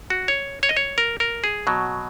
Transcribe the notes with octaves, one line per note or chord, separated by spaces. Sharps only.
F#4
C#5
C#5
D#5
C#5
A#4
A#4
G#4
B2 F#3